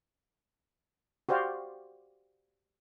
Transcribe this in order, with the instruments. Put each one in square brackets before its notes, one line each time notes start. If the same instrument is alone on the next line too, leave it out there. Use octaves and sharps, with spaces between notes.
[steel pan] F#4 G4 C5 D5 F5